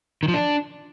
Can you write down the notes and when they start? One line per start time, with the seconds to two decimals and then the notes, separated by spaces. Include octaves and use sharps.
0.23 D#3
0.28 F3
0.34 D4